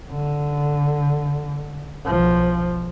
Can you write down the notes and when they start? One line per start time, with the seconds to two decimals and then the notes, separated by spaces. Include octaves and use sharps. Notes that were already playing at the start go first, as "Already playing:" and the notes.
0.11 D3
2.06 B1 F3